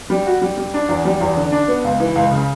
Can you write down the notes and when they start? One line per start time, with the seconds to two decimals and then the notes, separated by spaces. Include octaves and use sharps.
0.10 G3
0.26 F#4
0.41 G3
0.57 G3
0.74 D4
0.89 E2
1.05 G3
1.20 E2
1.37 D3
1.52 D4
1.68 B3
1.84 C#2
2.00 E3
2.15 C#2
2.31 C#3